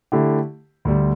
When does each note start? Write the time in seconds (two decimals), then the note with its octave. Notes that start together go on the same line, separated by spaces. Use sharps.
0.12 D3 A3 E4 G4
0.85 D2 D3 G3